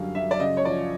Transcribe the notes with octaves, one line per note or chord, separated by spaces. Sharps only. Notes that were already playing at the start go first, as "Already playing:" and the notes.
Already playing: F#2 D3 G3 F5
F#2 E5
D5
C#3 D#5
C#5
F3 D5